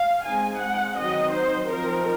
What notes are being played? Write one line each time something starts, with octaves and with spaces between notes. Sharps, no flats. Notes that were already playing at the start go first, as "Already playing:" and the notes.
Already playing: F5
G#3 C4 D#4 G#5
F#5
D#3 F#3 C4 D#4 D#5
C5
F3 C4 D#4 A#4